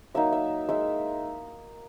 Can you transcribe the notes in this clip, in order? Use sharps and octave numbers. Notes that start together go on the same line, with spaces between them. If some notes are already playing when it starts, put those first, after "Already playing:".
F#3 A#3 D#4 E5
E5
G#3 D#4 E5